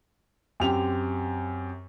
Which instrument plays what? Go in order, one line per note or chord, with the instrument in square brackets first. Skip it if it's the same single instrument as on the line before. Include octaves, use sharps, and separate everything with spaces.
[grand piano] F#2 C4 G4 F7